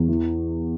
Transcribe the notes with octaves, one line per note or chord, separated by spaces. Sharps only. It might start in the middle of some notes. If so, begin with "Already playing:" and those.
Already playing: E2
E3